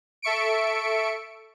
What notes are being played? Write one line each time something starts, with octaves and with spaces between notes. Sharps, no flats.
A4 E5 C#6 C#7 D7